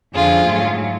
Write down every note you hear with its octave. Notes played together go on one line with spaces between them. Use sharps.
F2 D3 F3 F4 G#4
G#2 F#3 A3